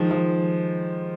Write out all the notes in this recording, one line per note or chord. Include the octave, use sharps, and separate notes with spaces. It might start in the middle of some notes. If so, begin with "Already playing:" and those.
Already playing: D#3 F3 G#3
F3